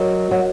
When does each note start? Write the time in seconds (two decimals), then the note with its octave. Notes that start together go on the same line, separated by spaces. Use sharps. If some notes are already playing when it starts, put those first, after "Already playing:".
Already playing: F#3 F#4 A#4 D#5
0.31 F#3